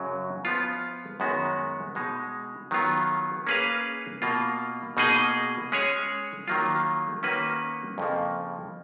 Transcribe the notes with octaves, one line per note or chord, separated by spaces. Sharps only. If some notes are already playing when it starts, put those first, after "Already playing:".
Already playing: F#2 C#3 F#3
F3 B3 F4
F#2 D#3 G#3 B3 F#4
B2 G#3 D#4
D#3 F#3 B3 F4
A#3 C#4 G#4 B4 F5
B2 A#3 F4
B2 A#3 D#4 G#4 D#5
G#3 C#4 G#4 C#5
D#3 F#3 A#3 F4
D#3 A#3 C#4 F#4 B4
F2 C#3 F3 A#3